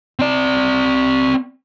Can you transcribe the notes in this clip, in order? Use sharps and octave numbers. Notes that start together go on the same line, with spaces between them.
C4 D5